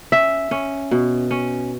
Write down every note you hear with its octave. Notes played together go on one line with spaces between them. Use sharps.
C#4 E5
C#4
B2
C#4